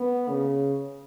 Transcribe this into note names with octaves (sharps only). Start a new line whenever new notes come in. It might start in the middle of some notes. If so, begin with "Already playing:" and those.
Already playing: B3
C#3